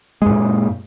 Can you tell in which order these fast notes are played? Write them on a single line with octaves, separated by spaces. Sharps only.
G#3 F#2 A#2